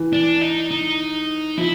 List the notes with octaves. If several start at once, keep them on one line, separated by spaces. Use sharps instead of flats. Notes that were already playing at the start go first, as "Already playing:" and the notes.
Already playing: E3
D4
D#4
D#4
F3 E4